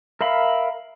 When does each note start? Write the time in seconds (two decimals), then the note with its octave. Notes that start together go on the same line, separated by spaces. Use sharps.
0.21 A#4 E5 F5 B5